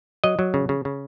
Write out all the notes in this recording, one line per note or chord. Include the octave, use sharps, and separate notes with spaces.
F#3 D#5
F#3
C#3
C#3
C#3